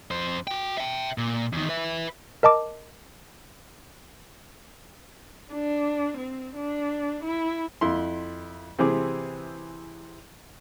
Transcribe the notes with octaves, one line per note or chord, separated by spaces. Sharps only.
F2 C5
F#4 G5
E5 G5
A#2
E2 D#3
B4 E5
A#4 D#5 A5 D6
D4
C4
D4
E4
F2 E4 C6
C3 E3 C4 G#4 D6